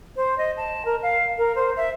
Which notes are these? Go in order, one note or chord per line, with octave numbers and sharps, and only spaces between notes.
C5
D#5
A5
A#4
F5
A#4
C5
E5